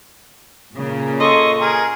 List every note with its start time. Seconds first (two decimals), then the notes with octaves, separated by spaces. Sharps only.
0.75 A#2 C#3 A#3
1.20 A4 D#5 C6 C#6
1.60 G#4 A#4